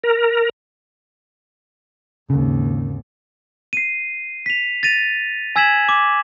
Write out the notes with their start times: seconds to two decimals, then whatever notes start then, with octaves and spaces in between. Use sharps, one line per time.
0.04 A#4
2.30 G#1 D#2 C#3
3.73 C7 D#7
4.46 B6 F7
4.83 A6 A#6 D#7 F7
5.56 G#5 E6 G#6 B6 E7 F#7
5.89 D6